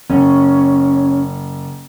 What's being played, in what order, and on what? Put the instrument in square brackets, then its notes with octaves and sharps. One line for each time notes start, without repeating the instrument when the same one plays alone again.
[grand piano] F#1 [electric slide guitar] C#4